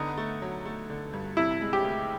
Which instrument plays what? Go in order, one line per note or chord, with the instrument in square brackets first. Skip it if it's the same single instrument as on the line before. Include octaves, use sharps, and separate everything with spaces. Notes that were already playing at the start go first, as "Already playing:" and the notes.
Already playing: [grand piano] D3 B3 [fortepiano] D#4
[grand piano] A3
F#3
A3
D3
G2
[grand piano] C3 [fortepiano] E4
[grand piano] G#3
[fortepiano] G4
[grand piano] D2